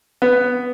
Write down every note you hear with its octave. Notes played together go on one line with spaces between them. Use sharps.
B3